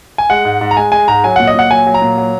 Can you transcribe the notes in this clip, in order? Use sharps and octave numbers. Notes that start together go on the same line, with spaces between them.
G#5
G#3 F#5
G#2
G#2
A#5
G#3 G#5
G#3 G#5
G#2 A#5
F#3 G#5
A#2 F#5
D#5
A#2 F#5
F#3 G#5
F#3
A#5
A#2
F#3